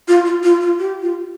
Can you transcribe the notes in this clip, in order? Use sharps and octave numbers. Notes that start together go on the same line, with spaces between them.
F4
F4
F4
F4
G4
F4